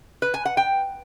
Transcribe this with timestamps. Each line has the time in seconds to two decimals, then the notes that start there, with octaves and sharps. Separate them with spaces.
0.22 B4
0.34 G#5
0.45 F#5
0.57 G5